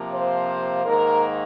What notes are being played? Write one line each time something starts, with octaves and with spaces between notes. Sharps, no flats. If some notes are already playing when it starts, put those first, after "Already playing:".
Already playing: C3 F3 A#3
C5
G#2 D#3 A#3 A#4